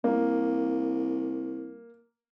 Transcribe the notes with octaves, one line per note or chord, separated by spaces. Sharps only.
C2 A#3